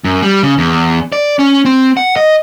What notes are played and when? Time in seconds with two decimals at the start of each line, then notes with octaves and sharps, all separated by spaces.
0.04 F#2
0.22 G3
0.43 C#3
0.58 E2
1.12 D5
1.39 C#4
1.65 C4
1.97 F#5
2.16 D#5